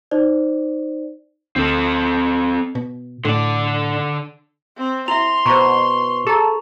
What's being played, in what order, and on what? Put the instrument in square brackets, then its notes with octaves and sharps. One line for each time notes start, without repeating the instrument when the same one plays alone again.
[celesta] D#4 C5 D5
[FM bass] D2 [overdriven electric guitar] C4 A4
[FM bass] B2
[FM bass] A2 [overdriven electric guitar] D3 D5
[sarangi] C4
[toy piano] E4 E5 [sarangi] C6 [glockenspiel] F7
[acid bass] B2 [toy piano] C5 A#5 [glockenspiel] C#6
[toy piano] G#4 A#5 [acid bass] A4